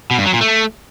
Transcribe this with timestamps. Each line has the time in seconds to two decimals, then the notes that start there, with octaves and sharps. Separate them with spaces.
0.11 B2
0.18 G2
0.26 F#3
0.33 A#2
0.41 A3